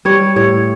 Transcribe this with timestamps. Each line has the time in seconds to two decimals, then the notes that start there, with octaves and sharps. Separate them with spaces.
0.05 G3 C#5
0.36 A2 C#5